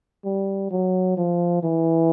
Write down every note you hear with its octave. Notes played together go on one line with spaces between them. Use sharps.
G3
F#3
F3
E3